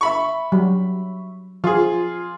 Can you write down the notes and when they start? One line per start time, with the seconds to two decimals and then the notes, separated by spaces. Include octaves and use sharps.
0.01 E5 B5 C#6
0.52 F#3 G3
1.64 F3 F4 G#4